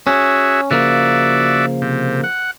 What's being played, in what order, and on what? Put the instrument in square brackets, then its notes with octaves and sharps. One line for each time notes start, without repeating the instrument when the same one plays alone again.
[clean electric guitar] C#4 [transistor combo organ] F#4 G#4 E5
[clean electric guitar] C#3 F3 A#3 [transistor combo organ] F#4 D5 E5
[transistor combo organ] C3
F#5